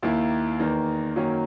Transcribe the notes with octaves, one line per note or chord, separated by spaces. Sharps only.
D#2 D#3 A#3 E4
E2 D#3 A#3
F#2 D#3 F#3 A#3 C#4